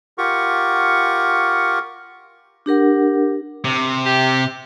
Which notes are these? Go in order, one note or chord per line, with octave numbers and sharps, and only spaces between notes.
F4 G4 A#4 F#5 C#6
D4 G4 A#4 F#5
C3
G4